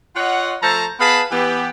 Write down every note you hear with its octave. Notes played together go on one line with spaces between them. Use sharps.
F4 C#5 D#5 F#5
F3 A3 C5 A5 A#5
B3 G#4 B4 F5 A5 B5
E3 B3 G4